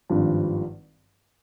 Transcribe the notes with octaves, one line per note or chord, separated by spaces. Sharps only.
G#1 G2 F3